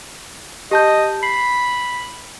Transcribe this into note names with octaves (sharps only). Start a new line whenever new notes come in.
G4 D#5 A5 G6
B5 C7